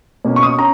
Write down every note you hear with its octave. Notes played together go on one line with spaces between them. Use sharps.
B2 A#3 C#4
C#6
D#6
C#6
C#4 A#5